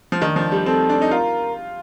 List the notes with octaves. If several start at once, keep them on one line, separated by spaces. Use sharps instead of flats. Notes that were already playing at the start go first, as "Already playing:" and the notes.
F3
D#3 D4
F3
G3
C4 A4
D4
D#4
F4 A#4